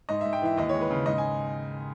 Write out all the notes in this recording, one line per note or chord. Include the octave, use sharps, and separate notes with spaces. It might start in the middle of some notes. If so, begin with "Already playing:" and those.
G#2 D#5
G#2 E5
G5
E3 E5
D#2 D#5
G#3 C#5
B4
C#3
G#2 D#5
G#5